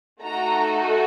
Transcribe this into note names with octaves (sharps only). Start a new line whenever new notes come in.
A3 D#4 F#4 A4 A#5